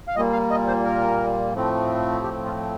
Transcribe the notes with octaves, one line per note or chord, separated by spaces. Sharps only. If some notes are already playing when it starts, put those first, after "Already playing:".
F5
A#2 G3 A#3 D#5
F5
D#5
C5
A#4
A2 F3 A3 C4
G4
F4